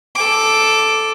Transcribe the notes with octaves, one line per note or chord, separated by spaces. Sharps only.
A4 D6